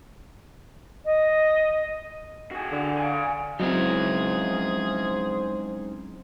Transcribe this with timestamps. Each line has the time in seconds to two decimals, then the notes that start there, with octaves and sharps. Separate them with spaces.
1.05 D#5
2.51 F#4 G#4
2.72 D3
2.98 F5 G#5
3.60 F#3 G#3 C4 C#4 D#4 E4 G#4 C5